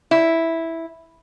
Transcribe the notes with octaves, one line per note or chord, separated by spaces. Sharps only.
E4